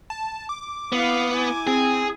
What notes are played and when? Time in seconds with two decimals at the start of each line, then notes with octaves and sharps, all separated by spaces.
0.10 A5
0.49 D6
0.92 B3 E4 F5
1.32 E4 G#5
1.67 C4 G#4